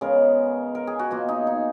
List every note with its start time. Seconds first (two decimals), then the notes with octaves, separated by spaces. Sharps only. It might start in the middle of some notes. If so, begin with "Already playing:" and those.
0.01 C#3 G#3 B3 A#4
0.75 A#4
0.87 G#4
0.99 F#4
1.11 B2 A#3 F4
1.28 D#4
1.47 D#4